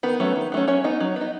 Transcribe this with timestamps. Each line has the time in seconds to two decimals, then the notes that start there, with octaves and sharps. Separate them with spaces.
0.03 D#3 B3 B4
0.20 F#3 A3 C#4
0.36 D#3
0.52 F#3 A3 C#4
0.68 F#3 C#4 C#5
0.84 B3 D#4
1.00 F#3
1.16 B3 D#4